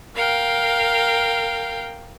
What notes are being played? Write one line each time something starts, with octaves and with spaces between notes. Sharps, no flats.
A#4 F5 G5